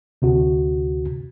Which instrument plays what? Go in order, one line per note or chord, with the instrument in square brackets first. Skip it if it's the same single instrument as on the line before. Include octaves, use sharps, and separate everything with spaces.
[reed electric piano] D2 C3 F#4